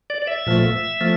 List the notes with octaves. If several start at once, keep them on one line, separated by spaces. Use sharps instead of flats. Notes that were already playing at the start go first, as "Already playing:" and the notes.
D5
D5
E5
A#2 F3 A3
F3 A3